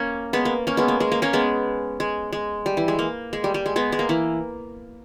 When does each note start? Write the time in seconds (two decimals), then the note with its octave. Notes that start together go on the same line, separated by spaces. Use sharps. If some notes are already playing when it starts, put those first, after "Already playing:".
Already playing: A#3 C#4
0.33 G#3 B3
0.45 A#3
0.67 A#3 C#4
0.77 G#3 B3
0.88 A#3
1.00 G#3
1.12 A#3
1.22 A#3 C#4
1.33 G#3 B3
2.00 G#3
2.33 G#3
2.66 G3
2.77 E3
2.88 G#3
2.99 A#3
3.33 G#3
3.44 G3
3.54 G3
3.66 G#3
3.76 G#3 B3
3.92 G#3
3.99 A#3
4.09 E3